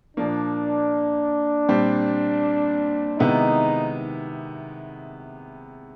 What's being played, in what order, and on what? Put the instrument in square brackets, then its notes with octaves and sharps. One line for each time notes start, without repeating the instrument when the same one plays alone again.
[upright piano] A#2 F3 A#3 [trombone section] D4
[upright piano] A#2 G3 C4
[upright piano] C3 D#3 G#3 B3 E4 [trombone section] D#4